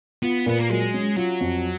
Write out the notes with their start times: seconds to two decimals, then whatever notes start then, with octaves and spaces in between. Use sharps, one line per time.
0.23 B3 F4
0.46 A#2 B3
0.59 A#3
0.70 F#3 G#3
0.94 C#4
1.17 F#3 F4
1.41 F2